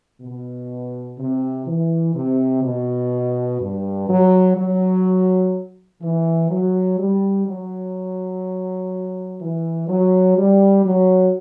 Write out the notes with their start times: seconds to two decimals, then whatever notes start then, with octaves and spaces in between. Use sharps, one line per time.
0.22 B2
1.18 C3
1.67 E3
2.15 C3
2.64 B2
3.60 G2
4.08 F#3
4.57 F#3
6.02 E3
6.50 F#3
6.99 G3
7.47 F#3
9.40 E3
9.88 F#3
10.37 G3
10.85 F#3